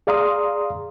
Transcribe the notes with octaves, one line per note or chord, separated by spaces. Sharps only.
G#4 D5 F5 A#5 C6 D#6